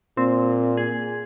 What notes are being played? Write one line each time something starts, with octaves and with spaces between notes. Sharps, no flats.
A#2 C4
G#4